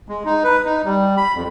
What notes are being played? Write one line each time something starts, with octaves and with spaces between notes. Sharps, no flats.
G#3
D#4
B4
D#4
G3
B5
F2